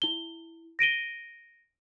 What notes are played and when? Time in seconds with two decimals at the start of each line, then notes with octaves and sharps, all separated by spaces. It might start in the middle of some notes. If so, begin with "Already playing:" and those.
0.02 E4 G7
0.79 A#6 D7 D#7 G7